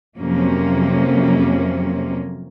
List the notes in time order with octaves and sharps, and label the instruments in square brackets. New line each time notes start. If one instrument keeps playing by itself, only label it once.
[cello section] F2 C3 F#3 A#3 C#4